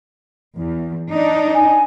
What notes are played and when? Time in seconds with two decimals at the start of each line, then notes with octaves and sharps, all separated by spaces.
0.57 E2
1.11 D4 D#4
1.54 G#5